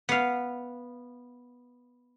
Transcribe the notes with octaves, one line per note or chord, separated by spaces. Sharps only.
B3 F5